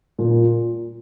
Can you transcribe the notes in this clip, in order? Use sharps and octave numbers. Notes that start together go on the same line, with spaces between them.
A#2